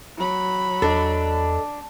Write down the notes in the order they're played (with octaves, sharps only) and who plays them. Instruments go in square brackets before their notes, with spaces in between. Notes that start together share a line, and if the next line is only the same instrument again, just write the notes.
[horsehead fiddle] F#3 B5
[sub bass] E2 [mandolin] D4 [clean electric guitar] A4 D#5